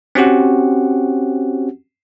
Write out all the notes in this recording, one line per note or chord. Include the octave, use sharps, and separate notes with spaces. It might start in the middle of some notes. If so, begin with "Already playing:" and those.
C4 C#4 F#4 G4 F#5